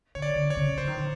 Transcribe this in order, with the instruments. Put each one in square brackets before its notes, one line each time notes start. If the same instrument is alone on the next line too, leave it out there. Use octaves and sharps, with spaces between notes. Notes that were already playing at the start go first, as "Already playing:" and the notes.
[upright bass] D3 [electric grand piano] C#5
[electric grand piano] D5
[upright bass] D3
[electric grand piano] C#5
[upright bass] C#3
[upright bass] D3 [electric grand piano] C5
[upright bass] D#3
D3